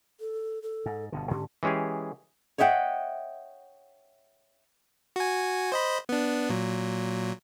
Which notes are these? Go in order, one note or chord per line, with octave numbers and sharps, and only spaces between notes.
A4
A4
G#2
G1 B2 D3
G#2 D3 C#4 G4
E3 G#3 C#4 G4 G#4
C#5 D#5 E5 F#5 G5
F#4 G#5
C5 D#5 B5
B3 D4
A#2 F#3